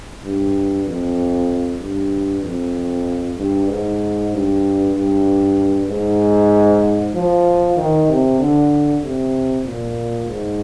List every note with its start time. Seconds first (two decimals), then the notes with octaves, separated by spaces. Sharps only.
0.24 G2
0.87 F2
1.81 G2
2.43 F2
3.38 G2
3.69 G#2
4.32 G2
4.95 G2
5.89 G#2
7.14 F3
7.77 D#3
8.09 C3
8.39 D3
9.02 C3
9.65 A#2
10.27 G#2